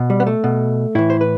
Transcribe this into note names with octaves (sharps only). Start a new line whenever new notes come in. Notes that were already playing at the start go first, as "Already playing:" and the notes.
Already playing: B2
G3
B3
A3
B2
A2 E3 E4
C5
B4